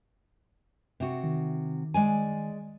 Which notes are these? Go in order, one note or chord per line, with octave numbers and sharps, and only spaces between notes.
C3 F#4
D#3
G#3 D5 G#5